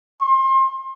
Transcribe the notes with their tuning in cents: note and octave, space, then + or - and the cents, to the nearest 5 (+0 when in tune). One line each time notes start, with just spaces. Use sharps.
C6 +30